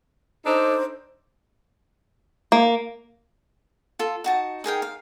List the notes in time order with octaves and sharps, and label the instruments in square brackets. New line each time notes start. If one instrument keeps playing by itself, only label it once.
[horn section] D4 D#4 A4 [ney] C5
[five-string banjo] A#3
[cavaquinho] F4 A4
D#4 F#4 A5
D#4 G#4 A#4 G5
F5